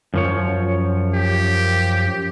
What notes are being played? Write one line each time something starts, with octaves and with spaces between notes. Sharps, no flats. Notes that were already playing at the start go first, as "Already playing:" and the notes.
F#2 F3 C#5
G4